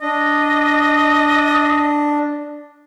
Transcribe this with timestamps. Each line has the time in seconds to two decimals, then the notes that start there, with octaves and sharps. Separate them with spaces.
0.02 D4 D#5